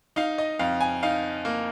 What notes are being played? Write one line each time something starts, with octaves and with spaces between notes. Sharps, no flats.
D#4 F5
D#5
F2 F5
G#5
D#4 F5
A#3